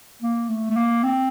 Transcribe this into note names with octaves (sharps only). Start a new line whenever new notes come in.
A#3
A3
A3
A#3
C4